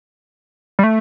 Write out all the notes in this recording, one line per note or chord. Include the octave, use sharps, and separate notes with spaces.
G3
A3